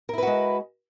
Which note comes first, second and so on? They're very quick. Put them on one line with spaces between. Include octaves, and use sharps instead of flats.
A#4 E4 B4 F#4 G#3